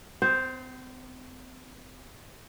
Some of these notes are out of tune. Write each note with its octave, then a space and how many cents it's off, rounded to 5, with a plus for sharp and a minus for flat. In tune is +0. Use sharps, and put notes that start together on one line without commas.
C4 -45 C5 +0 G5 +0